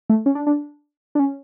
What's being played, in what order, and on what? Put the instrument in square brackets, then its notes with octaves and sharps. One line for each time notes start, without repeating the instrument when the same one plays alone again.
[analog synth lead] A3
C#4
D4
D4
D4
C#4